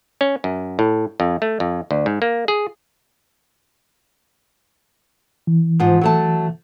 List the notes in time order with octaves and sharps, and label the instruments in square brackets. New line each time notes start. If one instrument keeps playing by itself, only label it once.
[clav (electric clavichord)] C#4
F#2
A2
F2
A3
F2
D2
G#2
A#3
G#4
[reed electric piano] E3
[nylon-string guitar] G#2 F3
F#3 A3 A5